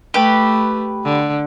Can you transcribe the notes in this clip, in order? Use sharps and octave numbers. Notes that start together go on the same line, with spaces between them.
A3 G4 B4
D3